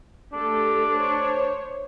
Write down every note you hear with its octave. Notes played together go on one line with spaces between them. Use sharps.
A3 D4 G4 A4
C5 C#5